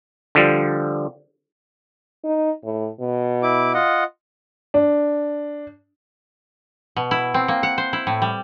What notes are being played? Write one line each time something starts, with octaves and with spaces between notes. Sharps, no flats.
D3 F3 G3
D#4
A2
B2
E4 D6
F4 D#5 F#5
D4
B2
E4
C4
A#3
F#5
C5
E4
A2
G3